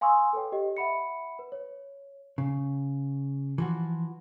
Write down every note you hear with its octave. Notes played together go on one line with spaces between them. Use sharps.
F5 G#5 C6 C#6 D#6 E6
A4 B4 C#5 G5
G4 D#5
E5 F#5 B5 C#7
B4
C#5
C#3
E3 F3 F#4